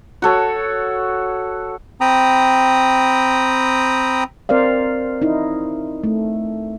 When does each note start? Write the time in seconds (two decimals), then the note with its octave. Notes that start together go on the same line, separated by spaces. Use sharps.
0.22 F#4 A4 C#5
2.01 C4 G5 A#5 B5 D#6
4.49 C4 A#4 C5 D5 F5
5.22 D#4 E4
6.04 A3